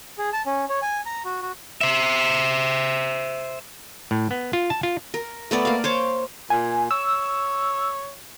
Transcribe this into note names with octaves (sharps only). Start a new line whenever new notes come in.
G#4
A5
C#4
C#5
G#5
A#5
F#4
F#4
C5 E5
A2
B3
F4
A5
F4
A#4
A3 B3 D5
A#3 F5
C5 C#5 D6
A#2 G#5
C#5 E6